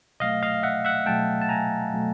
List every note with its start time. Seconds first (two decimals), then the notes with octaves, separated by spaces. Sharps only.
0.20 B2 F#3 A3 D#5 F5
0.43 D#5 F5
0.63 E5 F#5
0.85 E5 F#5
1.06 B2 F#3 A3 G5 A5
1.41 A5
1.49 G#5 A#5
1.93 B2 F#3 A3